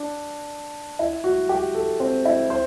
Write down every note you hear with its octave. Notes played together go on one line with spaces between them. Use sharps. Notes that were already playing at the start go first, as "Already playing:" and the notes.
Already playing: D4
E4
F#4
G4
A4
C4
E4
C5